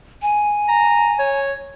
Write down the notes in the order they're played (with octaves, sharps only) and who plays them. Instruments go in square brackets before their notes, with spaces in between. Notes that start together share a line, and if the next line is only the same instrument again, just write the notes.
[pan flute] G#5
[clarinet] A#5
C#5